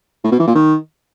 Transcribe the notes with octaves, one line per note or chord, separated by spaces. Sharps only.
A2
B2
E3
A#2
D#3